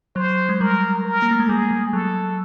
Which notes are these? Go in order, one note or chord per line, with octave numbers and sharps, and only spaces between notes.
F#3 C5
G#3
G3 A#4
A#4
A#3
A3
G#3
G3 G#4
G3
F#3 A4